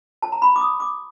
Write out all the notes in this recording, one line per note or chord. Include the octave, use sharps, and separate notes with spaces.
F4 A#4 C#5 A5
A#5
B5
D6
D#6
D6